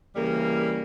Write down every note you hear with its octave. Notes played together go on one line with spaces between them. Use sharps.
C#3 E3 G3 A#3